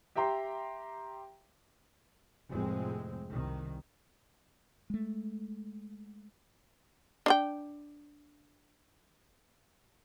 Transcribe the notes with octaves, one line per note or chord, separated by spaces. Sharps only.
G4 E5 G5 A#5 C6
F1 F2 A2 G#3 C4
C2 D#3
G#3 A3
D4 D#5 G5